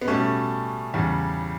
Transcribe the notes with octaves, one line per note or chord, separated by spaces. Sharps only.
B3
B2 G3 A3 C#4
E2 C#3 G3